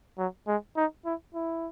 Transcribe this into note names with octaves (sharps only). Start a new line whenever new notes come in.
F#3
G#3
D#4
E4
E4